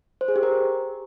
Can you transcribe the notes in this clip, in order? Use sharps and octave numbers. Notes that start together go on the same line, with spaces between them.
C5
G#4
G4
A#4